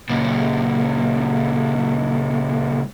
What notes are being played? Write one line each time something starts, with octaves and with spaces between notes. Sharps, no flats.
C#2 A#2